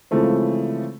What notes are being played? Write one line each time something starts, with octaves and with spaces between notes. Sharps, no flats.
C#3 E3 F3 G#3 A3 C4